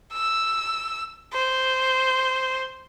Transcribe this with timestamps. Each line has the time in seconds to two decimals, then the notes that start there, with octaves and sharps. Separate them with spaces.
0.13 E6
1.33 C5